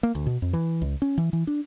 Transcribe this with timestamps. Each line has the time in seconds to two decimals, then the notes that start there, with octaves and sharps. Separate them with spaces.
0.03 A#3
0.15 D2
0.26 B2
0.42 F2
0.53 E3
0.82 C#2
1.02 C#4
1.18 E3
1.33 E3
1.47 D4